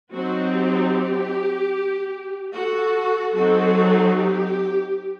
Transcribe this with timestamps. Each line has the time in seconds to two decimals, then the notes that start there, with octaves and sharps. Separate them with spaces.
0.12 F#3 C4 D#4 F#4
0.52 G4
2.53 F#4 A4
3.34 F#3 C4 D#4 F#4 A4
4.15 G4